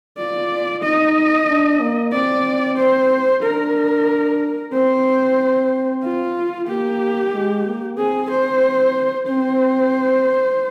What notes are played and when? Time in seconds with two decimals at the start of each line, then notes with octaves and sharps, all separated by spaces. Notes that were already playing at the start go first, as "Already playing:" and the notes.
0.18 F4 D5
0.83 D#4 D#5
1.49 D4
1.81 A#3
2.13 C4 D5
2.78 C5
3.42 D4 A#4
4.73 C4 C5
6.03 F4
6.68 A#3 G4
7.33 G#3
7.66 A#3
7.97 C4 G#4
8.30 C5
9.27 C4 C5